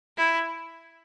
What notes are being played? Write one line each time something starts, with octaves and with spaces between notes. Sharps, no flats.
E4